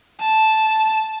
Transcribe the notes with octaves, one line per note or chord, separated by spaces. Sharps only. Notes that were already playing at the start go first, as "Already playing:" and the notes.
A5